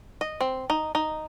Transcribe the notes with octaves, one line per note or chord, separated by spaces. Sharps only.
D#5
C4
D#4
D#4